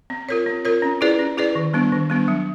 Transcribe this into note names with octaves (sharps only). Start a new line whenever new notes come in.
C4
F4 A#4 C#5
C4
F4 A#4 C#5
C#4
E4 G#4 B4 D5
C#4
E4 G#4 B4 D5
D#3
G3 B3 D4
D#3
G3 B3 D4
F#3